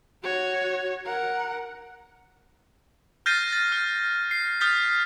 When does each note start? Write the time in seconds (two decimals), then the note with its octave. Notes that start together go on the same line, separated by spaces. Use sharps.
0.23 F#4 C#5
1.06 A#4 F#5
3.26 F6 G6 A6 A#6 C7 D#7
3.52 A6
3.72 F6
4.31 C7
4.61 D#6 F6 G6 A6 B6